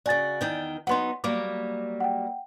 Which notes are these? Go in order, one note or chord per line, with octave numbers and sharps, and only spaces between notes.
C#3 F#4 D5 G#5 A6
E2 D#3 G5
F#3 B3 D#4 F#5 C6
F#3 G3 A#3 D6
F#5 G5